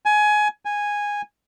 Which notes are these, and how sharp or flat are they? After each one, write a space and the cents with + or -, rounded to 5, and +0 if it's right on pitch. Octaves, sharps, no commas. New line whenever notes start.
G#5 +20
G#5 -10